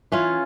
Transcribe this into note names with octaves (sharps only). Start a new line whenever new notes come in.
E3 C#4 F4